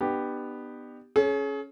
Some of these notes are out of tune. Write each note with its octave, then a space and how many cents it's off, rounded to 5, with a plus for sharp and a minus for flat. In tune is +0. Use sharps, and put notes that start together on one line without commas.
B3 +0 D4 +40 G4 +0
C#4 +0 G#4 +35